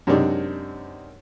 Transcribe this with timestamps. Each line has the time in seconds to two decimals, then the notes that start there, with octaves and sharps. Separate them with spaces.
0.07 F#2 C3 G#3 C4 D4 D#4